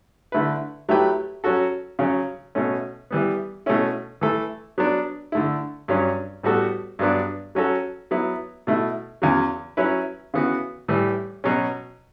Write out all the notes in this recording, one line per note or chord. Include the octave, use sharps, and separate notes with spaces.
D3 A3 E4 B4
F#3 A3 E4 G4 B4
F#3 C#4 F#4 A4
C#3 F#3 C#4
B2 A3 C#4
E3 G3 B3
B2 A3 C#4 E4
E3 A3 E4 A4
F#3 B3 D4
D3 A3 E4
G2 F#3 C#4
A2 G3 B3 F#4 A4
G2 F#3 B3 D4
F#3 C#4 F#4 A4
F#3 B3 E4
B2 A3 E4
E2 C#3 F#3
F#3 C#4 E4 B4
C#3 E3 B3 F#4
A2 E3 G3
B2 F#3 C#4